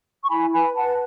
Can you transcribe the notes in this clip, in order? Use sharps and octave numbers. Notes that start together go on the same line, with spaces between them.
C#6
E4 G#5 B5
B4 G#5 B5
B4 F#5 A5